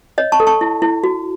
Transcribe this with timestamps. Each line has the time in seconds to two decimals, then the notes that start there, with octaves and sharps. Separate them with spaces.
0.18 C#5 D#5
0.32 A5 C#6
0.40 A4
0.47 A5 C#6
0.61 E4
0.82 E4
1.04 F#4